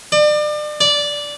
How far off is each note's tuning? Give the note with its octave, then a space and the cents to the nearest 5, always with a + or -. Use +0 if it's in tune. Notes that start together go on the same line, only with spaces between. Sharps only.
D5 +35
D5 -10